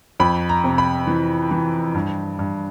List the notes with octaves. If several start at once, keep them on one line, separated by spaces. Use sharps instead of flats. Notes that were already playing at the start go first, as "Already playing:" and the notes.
F2 B5
A#5
C3
B5
E3
E3
G2
G2